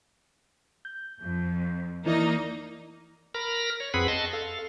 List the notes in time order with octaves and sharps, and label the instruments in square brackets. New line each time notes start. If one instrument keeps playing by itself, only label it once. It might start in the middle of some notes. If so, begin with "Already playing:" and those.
[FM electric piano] G6
[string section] F2
[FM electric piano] E3 E4 D5 [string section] A#3 D#4
[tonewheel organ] A#4 A#5 B5 F6
C#5
F2 C4 G#4 B4 F#5 B5
D#5 A5 C6 C#6
A4 F5